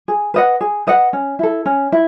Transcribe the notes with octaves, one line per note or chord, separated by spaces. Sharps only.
G#4
B4 D#5 F#5
G#4
B4 D#5 F#5
C#4
E4 A4
C#4
E4